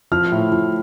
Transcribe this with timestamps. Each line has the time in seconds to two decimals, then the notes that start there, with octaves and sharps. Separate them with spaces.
0.12 F3 F6
0.32 A2
0.52 F3